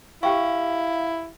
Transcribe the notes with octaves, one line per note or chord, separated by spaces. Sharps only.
E4 G4 F5 G5 C#6